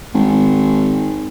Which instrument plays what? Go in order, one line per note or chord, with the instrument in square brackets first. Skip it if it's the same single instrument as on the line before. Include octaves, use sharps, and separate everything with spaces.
[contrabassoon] G#1